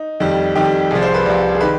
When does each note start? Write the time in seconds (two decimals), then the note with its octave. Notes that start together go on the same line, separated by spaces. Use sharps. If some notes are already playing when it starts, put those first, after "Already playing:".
Already playing: D#4
0.20 F2 D#3 G3
0.55 F2 D#3 G3 G4
0.91 C2 C3 F3 G#4
1.02 C5
1.14 B4
1.26 C2 C3 F3
1.55 G#4
1.61 D#3 B4